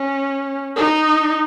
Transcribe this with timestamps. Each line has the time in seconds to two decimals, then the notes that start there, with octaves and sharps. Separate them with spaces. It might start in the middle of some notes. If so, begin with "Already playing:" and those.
Already playing: C#4
0.76 D#4